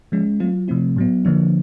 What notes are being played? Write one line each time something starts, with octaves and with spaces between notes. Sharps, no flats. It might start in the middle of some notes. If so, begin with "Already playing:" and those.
F3 G#3 C#4
F#3 A3 C4 F4
C3 F3 A3 C4 E4
A2 F#3 B3
D3 F3 A#3 D4